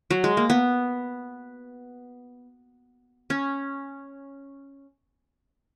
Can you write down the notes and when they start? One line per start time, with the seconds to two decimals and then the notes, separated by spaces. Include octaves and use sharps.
0.11 F#3
0.24 G#3
0.37 A#3
0.50 B3
3.30 C#4